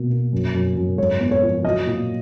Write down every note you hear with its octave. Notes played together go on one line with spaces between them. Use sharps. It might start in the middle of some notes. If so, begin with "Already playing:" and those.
Already playing: B2 A#3
A#3
F#2
F#2
F#2
G#2 C#5
B3
C#5
F3
F#3 D#5
A#2